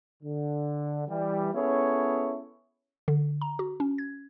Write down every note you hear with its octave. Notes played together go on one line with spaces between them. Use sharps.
D3
E3 G3
B3 C#4 E4 G#4 A4 C#5
D3
A#5
F#4
C#4
G#6